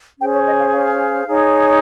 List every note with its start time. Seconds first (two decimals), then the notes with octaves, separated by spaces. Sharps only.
0.19 C#4 G#4 C5 G5
0.33 C#5
0.46 D#5
0.59 F5
0.72 F5
1.27 D#4 G#4 C#5